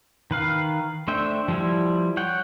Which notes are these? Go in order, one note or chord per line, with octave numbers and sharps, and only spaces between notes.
D#3 B4 F5
A3 D4 C5 E5 G5
F3 G3 E4
C#5 F#5 G5